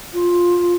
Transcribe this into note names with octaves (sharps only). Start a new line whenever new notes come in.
F4